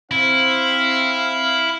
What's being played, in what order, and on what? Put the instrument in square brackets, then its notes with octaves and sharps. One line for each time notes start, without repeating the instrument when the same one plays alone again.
[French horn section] C4 [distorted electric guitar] E4 [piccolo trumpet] F5